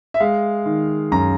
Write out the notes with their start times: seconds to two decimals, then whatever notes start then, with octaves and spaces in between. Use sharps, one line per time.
0.14 E5
0.20 G#3 F5
0.66 D#3
1.12 F#2 A#5